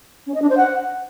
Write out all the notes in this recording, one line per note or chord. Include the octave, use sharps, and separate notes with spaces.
C#4
D#5
D4
C5
F#5